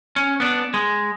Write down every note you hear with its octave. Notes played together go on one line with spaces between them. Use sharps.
C#4
B3 D4
G#3